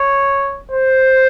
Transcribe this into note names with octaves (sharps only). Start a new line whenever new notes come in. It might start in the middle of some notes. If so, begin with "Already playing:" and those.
Already playing: C#5
C5